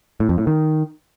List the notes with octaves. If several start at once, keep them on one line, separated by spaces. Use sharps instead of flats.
A2
F2
A2
D#3